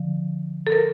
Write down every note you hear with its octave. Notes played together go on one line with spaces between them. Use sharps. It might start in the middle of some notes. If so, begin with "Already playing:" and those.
Already playing: D3 F3
A4
A#4